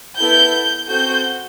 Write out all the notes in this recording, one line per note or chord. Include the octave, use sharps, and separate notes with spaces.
B3 E4 A4 G6
C4 F#4 A4 G6